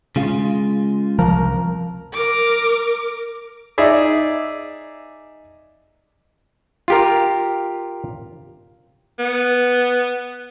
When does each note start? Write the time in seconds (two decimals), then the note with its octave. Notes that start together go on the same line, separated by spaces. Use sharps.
0.16 C#3 G#3 F4
1.19 C2 F3 A#4
2.13 A#4 D6
3.78 D#4 G#4 D5 E5
6.88 F4 G4 A#4
9.19 B3